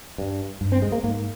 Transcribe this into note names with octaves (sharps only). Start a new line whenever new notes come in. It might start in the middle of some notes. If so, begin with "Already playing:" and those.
G2
G2
C4
G#3
A#3
G#2 A#3